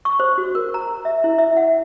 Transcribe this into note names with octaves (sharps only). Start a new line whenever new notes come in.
C#6
C5
F#4
A#4
A#5
E5
E4
E5
F#5